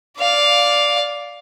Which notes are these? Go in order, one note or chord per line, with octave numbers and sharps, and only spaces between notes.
D5 F5